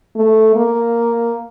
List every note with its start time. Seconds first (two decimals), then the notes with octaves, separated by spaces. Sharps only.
0.16 A3
0.55 A#3